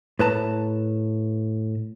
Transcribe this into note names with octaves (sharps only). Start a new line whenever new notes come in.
A2 B4 A5 A#5